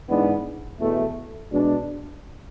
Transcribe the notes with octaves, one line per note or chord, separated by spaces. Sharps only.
G#2 E3 G#3 B3 D4
E2 B2 A3
B2 G#3 D4